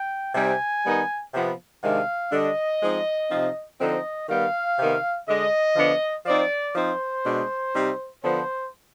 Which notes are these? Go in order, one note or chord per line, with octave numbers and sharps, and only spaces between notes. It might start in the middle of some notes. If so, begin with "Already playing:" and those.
Already playing: G5
C3 G3 C4 D#4 G#5
D#3 G3 B3 D#4
C3 F3 B3
C3 D#3 G#3 D4 F5
D3 G3 D4 D#5
F3 G#3 C4 D#4
C3 F3 C4 D#4
D3 F3 C4 D#4 D#5
D#3 G3 B3 F5
C3 D#3 B3
D3 G#3 D4 D#5
D3 F3 B3 D4
F3 C4 D#4 D5
F3 C4 D#4 C5
B2 G#3 D4
C3 G3 C4 D#4
D3 F3 B3 C5